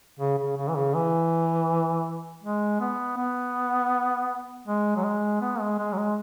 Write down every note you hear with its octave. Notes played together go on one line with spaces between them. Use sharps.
C#3
C#3
C#3
E3
C#3
E3
G#3
B3
B3
G#3
F#3
G#3
B3
G#3
G#3
F#3
G#3